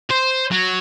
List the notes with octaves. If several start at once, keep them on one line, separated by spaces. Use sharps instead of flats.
C5
F#3